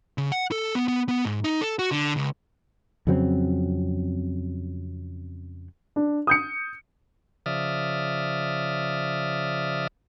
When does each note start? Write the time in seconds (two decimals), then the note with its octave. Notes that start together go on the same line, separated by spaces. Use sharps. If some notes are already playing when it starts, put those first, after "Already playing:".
0.18 C#3
0.32 F#5
0.52 A4
0.75 B3
0.88 B3
1.09 B3
1.25 G#2
1.44 D#4
1.61 A4
1.79 F#4
1.92 D3
2.17 C#2
3.07 F2 C#3 F#3 C4
5.96 D4
6.27 D#6 G6 C#7
7.46 C#3 F3 D5 E5 D#6 F6